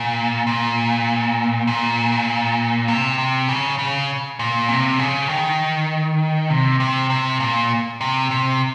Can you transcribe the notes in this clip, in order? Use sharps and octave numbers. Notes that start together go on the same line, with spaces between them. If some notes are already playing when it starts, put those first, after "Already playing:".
Already playing: A#2
A#2
A#2
C3
C3
C#3
C#3
A#2
C3
C#3
D#3
C3
C3
C3
A#2
C3
C3